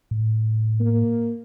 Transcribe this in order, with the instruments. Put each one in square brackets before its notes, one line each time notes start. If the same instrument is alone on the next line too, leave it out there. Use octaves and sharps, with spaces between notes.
[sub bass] A2
[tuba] A#3